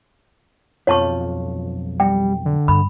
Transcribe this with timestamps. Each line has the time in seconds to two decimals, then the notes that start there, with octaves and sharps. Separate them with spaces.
0.87 B1 F2 F4 C#5 A5 C#6
2.00 G3 G5
2.46 D3
2.68 G2 B5